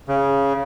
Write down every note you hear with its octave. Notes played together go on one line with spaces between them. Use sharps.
C#3